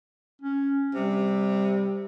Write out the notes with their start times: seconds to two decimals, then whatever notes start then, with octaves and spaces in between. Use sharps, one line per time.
0.42 C#4
0.95 C3 G3